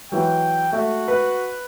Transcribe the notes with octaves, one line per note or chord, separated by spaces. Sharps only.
E3 F#3 G5
A3 F#4 E5
B4